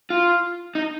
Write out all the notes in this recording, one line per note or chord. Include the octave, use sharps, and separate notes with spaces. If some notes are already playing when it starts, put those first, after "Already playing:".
F4
D#4